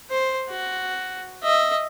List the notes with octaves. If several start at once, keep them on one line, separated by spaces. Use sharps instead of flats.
C5
F#4
D#5 E5